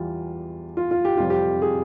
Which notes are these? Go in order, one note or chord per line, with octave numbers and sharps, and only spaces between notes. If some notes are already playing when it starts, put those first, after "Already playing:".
Already playing: E2 E3 G3 F4
F4
F4
G4
F2 C3 G3 F4
G4
G#4